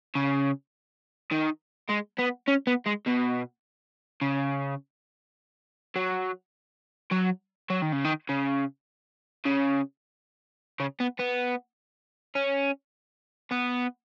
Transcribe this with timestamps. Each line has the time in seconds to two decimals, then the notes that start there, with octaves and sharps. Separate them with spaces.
0.15 C#3
1.32 D#3
1.90 G#3
2.19 B3
2.48 C#4
2.67 B3
2.86 G#3
3.06 B2
4.22 C#3
5.96 F#3
7.12 F#3
7.70 F#3
7.82 D#3
7.92 C#3
8.04 D#3
8.29 C#3
9.45 C#3
10.80 C#3
11.00 B3
11.19 B3
12.35 C#4
13.51 B3